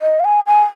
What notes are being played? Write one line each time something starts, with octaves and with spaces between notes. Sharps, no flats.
D#5
F5
G#5
G#5